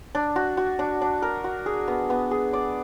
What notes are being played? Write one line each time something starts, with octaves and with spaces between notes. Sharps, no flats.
D4
F#4
F#4
D4
D4
A#4
F#4
G#4
B3
B3
G#4
D5